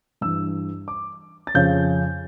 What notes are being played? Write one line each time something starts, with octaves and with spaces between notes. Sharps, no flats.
G2 E3 G3 E6
D6
A6
F2 C#3 F3 C#4 G6